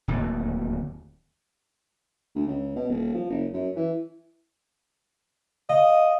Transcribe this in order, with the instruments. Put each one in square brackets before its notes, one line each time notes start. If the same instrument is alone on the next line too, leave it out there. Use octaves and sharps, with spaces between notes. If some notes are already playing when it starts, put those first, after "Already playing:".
[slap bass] D1 D#2
[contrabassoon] D2
C#2
B2
D#1
F3
F#1
F#2
E3
[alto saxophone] D#5 [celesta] F5